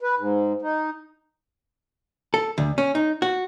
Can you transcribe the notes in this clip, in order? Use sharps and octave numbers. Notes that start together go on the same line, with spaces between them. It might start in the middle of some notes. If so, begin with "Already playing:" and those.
B4
G#2
D#4
A4
D2
C#4
D#4
F#4